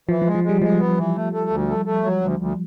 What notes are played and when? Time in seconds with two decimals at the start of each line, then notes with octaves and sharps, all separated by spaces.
0.09 E3 F3
0.22 F3
0.26 G#3
0.35 F3
0.44 G3 G#3
0.61 F3 G#3
0.80 B3
0.97 E3
1.16 A3
1.33 A3
1.50 D2
1.68 A3
1.85 A3
2.04 F#3
2.21 D2
2.39 D2